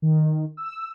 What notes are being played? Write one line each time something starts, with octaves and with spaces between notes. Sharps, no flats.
D#3
E6